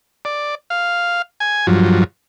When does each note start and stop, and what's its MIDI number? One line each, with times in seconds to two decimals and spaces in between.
0.25 0.55 74
0.70 1.22 77
1.40 1.67 80
1.67 2.04 43
1.67 2.04 53
1.67 2.04 54